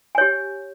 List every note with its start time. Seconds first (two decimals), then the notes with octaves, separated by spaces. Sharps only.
0.15 G#5
0.18 C#5
0.21 G4